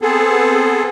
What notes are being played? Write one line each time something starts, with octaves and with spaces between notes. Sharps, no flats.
B3 C4 G#4 A4